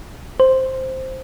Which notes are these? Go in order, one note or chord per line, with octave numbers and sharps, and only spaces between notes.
C5